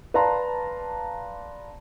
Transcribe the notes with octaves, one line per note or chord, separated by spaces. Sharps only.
B4 D5 F5 A5 A#5 C6